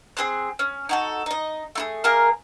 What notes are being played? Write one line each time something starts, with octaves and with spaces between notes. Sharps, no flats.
C4 G#4 C6 F#6
C#4
D#4 F#4 A4
D#4 D#5
A3 E4 G#4
A#3 G#4 A#4